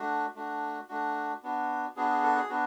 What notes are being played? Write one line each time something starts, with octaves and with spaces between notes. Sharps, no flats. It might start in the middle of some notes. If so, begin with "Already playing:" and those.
Already playing: A3 D4 F#4
A3 D4 F#4
A3 D4 F#4
B3 D4 F#4
B3 D4 F#4 G#4
G#4
A4
G#4
B3 D4 F#4